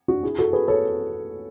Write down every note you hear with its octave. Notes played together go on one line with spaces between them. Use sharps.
D4 F#4
E4 G#4
F#4 A4
G#4 B4
A4 C#5